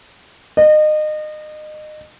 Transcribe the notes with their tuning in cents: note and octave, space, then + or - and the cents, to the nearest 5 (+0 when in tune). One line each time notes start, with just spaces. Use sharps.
D#5 -30